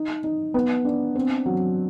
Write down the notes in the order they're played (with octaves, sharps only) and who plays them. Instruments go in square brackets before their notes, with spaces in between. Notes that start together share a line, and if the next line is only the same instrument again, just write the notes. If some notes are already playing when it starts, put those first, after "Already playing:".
Already playing: [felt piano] D#4
D#4
B3
D4
C4
F#3